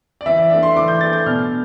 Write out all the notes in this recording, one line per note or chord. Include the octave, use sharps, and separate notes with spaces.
D5
E3 E5
D5
A3 D4 E5
C6
E3 D6
G6
A3 D4 A6
G6
B2 F6